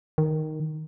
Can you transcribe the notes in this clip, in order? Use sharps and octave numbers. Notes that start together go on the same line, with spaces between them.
D#3